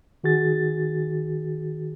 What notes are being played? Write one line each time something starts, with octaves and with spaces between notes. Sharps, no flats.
D#3 F#4 G#4 A6